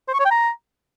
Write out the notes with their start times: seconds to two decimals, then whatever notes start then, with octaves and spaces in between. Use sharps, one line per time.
0.08 C5
0.14 C#6
0.19 C#5
0.25 G5
0.31 A#5